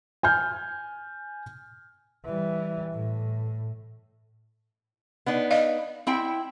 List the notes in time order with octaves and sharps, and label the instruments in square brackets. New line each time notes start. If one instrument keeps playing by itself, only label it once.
[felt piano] G#5 F6 G6
[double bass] E3 G3
A2
[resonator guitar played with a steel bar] B3 D4 D#4
[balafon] D#5 F5
[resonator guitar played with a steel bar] C4 E4 G5